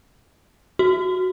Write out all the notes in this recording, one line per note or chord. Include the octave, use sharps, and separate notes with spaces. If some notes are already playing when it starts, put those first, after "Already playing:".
F#4